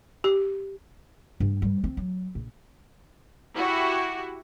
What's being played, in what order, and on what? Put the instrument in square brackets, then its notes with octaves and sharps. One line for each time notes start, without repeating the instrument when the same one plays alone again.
[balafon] G4
[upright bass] G2
G3
C4
F#3
A#1
[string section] E4 F#4 G4